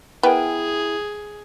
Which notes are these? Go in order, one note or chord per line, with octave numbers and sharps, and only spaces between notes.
B3 E4 G#4 A#4 G5 G#5